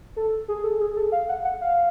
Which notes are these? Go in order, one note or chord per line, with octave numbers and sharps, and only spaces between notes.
A4
G#4
A4
G#4
A4
F5
F#5
F#5
F5